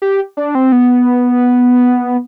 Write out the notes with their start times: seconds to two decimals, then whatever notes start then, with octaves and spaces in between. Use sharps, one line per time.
0.02 G4
0.37 D4
0.55 C4
0.72 B3